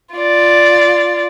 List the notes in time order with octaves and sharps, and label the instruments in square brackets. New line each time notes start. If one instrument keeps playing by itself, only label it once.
[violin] F4 D5